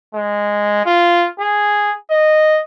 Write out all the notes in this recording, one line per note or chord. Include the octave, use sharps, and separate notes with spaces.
G#3
F4
G#4
D#5